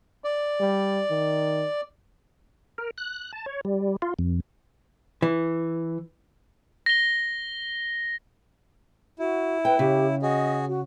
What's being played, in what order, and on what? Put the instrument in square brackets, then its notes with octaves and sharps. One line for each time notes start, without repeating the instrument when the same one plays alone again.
[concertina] D5
[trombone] G3
D#3
[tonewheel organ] A#4
F#6
A5
C#5
G3
F4
F2
[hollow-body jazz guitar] E3
[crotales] A#6 G7
[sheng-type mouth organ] E4 [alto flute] F#4
[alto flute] B4 [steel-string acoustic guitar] G5
[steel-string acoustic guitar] C#3 [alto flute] G4
[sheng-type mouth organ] F#4 G#4 [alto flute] D#5
[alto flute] F#4